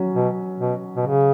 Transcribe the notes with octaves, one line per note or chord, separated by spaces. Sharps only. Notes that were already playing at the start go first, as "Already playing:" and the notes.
Already playing: F#3 C#4
B2
B2
B2
C#3